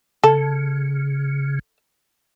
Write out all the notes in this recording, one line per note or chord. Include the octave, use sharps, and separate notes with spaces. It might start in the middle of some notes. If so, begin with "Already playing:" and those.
C#3 A4